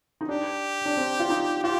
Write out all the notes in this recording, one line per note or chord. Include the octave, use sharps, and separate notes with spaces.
D#4
D4 G4
D4
C4
F4
D#4
F4 G4